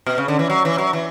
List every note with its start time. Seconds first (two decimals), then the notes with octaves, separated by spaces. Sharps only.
0.07 B2
0.18 C#3
0.28 D3
0.39 E3
0.50 F#3
0.65 E3
0.78 F#3
0.93 E3